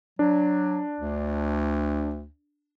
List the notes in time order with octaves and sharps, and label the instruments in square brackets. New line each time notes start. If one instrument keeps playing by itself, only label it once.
[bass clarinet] F#3 [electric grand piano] D4
[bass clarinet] D2